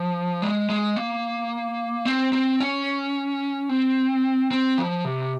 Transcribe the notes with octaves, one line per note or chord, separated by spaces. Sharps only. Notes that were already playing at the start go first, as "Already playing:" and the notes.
Already playing: F3
G#3
G#3
A#3
C4
C4
C#4
C4
C4
F3
C3